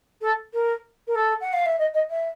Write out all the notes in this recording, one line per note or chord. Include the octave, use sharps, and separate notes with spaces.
A4
A#4
A#4
A4
F#5
F5
E5
D#5
D#5
E5